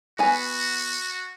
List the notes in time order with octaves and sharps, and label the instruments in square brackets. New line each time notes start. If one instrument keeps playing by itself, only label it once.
[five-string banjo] B3 G#5 [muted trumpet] F#4